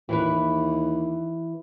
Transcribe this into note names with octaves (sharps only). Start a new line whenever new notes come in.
D#2 E3 E4 B4